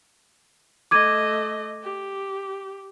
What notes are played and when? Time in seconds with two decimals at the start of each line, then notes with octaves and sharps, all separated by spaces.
0.91 A3 D#5 D6 G#6 D#7
1.82 G4